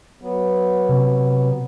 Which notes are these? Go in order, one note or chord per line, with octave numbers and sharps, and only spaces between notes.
F#3 B3
C3